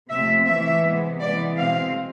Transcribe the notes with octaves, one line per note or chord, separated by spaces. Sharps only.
C3 F3 A3 C4 E5
A2 E3 A3 E5
C3 G#3 B3
E3 G#3 B3 D5
B2 G#3 C4 F5